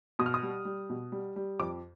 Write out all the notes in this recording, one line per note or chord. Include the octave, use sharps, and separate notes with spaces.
B2 D#6
F6
D#6
G3
G3
B2
G3
G3
F2 D6